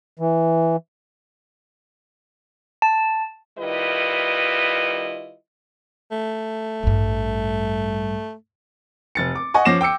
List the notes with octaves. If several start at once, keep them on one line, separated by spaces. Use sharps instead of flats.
E3
A5
D#3 G3 E4 F4 B4 D#5
A3
A1 G2
F1 A6 C#7
D6
D#5 F#5 G#5 C#6
F3 C#4 D6 A#6 C7 E7
G5 D6 E6 C#7